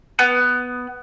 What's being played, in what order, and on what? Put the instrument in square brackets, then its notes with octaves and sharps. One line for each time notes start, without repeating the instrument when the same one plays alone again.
[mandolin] B3